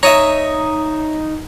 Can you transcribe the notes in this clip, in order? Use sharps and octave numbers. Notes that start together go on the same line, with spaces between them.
D#4 C#5 E5 A#5 D#6